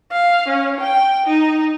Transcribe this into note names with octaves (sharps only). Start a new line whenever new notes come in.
F5
C#4
G5
D#4